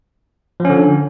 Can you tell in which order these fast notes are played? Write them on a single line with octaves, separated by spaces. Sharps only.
F3 C#4 D3